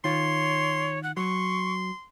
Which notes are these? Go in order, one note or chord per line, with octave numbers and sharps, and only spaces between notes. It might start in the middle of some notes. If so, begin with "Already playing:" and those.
D#3 F4 C#5 C6
F#5
F#3 C6 C#6